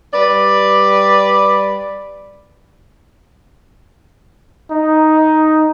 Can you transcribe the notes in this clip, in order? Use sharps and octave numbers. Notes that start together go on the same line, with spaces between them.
G3 B4 D5
D#4